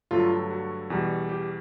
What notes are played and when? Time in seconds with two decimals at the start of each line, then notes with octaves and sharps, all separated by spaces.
0.11 G2 D3 F#3 A3 F4
0.51 F#4
0.90 E2 B2 G3
1.29 G4